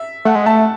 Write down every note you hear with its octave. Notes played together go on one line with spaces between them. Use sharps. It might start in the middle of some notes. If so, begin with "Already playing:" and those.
Already playing: E5
A3 F#5
G#3
A3 A5